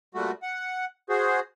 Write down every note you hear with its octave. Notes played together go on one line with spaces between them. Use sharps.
A#2 G3 A3 F#4
F#5
F#4 G#4 C5